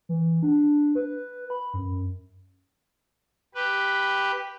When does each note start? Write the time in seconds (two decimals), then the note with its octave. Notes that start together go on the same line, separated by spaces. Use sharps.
0.09 E3
0.43 D4
0.95 B4
1.50 B5
1.74 F#2
3.55 G4 B4